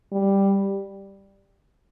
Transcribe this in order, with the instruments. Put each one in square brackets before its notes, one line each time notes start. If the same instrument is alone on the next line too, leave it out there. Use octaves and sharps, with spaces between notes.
[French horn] G3